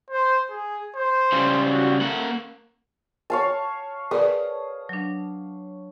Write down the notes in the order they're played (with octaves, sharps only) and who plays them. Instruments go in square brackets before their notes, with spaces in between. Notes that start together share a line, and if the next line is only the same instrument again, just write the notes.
[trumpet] C5
G#4
C5
[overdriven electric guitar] C#3 G3
[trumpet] F#4
[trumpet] A3 [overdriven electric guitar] A#3 F#5
[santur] C#5 F5 A5
[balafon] G#4 A#4 D5 [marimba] B4 [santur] D#6
[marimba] F#3 D4